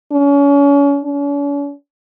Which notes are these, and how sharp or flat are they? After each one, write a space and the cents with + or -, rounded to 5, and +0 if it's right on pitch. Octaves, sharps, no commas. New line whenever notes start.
C#4 +35
C#4 +45